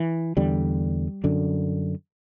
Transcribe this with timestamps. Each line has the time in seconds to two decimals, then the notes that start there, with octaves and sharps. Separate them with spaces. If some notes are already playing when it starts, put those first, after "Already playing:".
Already playing: E3
0.37 E2 D3 G3
1.24 F#2 D3